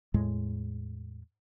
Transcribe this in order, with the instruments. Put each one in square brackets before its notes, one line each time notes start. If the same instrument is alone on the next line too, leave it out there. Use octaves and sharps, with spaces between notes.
[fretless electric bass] E2 A2 G#3